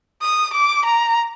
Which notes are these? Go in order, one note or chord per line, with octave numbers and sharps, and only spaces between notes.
D#6
D6
A#5